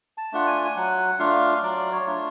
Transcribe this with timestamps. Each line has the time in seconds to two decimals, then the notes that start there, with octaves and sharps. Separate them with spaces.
0.18 A5
0.32 A3 D4 F4 F#5
0.47 G#5
0.65 G#5
0.76 F#3 F#5
1.19 A3 D4 F4 F5
1.63 F#3 D5
1.92 C#5
2.07 A3 D4 F4